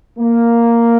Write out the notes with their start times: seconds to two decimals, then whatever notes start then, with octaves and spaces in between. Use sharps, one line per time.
0.18 A#3